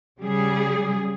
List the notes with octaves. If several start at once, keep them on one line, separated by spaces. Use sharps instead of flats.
C#3 G3 G#4